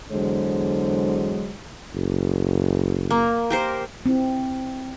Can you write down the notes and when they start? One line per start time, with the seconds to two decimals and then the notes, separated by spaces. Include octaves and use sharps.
0.12 E2 D3 F#3 G#3 C5
1.94 F#1
3.10 A#3
3.50 G4 A#4 C5
4.06 C4 E4